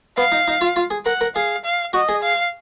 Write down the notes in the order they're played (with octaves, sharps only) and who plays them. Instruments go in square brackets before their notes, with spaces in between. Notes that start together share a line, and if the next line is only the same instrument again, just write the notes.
[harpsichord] B3 [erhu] F5
[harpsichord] D#4
D#4
F4
F4
G#4
[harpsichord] A#4 [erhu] F#5
[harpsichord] A#4
[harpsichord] G#4 [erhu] F5
[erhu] F5
[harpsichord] F#4 [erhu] D#5
[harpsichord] G#4
[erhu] F5